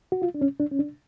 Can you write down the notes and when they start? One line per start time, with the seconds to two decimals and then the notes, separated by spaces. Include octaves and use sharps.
0.12 F#4
0.22 F4
0.34 D4
0.41 C#4
0.60 D4
0.71 C#4
0.79 D4